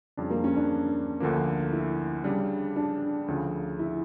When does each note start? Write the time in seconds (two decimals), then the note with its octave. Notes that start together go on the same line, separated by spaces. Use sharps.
0.17 F2 C#3 G3 D4
0.31 A#3
0.44 C#4
0.56 D4
1.20 D2 D3 F3 A#3
1.72 E4
2.24 C#3 G3 D4
2.76 D4
3.28 D2 C#3 F3
3.79 E4